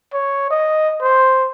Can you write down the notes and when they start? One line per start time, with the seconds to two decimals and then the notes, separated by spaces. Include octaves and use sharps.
0.13 C#5
0.50 D#5
1.01 C5